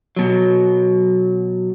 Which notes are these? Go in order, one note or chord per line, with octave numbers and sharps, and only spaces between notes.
B2 F#3